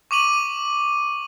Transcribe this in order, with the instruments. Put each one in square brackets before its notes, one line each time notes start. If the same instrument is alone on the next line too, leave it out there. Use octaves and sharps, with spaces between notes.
[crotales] C#6 D6 D#7 F#7